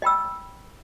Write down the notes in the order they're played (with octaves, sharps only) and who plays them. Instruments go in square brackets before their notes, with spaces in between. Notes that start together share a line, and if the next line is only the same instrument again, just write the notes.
[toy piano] D#5 G5 B5 E6